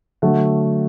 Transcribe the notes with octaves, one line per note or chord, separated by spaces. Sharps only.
D3 F#3 A3 F#5